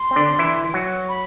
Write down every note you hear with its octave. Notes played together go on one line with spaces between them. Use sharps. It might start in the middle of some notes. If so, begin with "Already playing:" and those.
Already playing: C6
C4
D3 D4
E3 E4
F#3 F#4
B5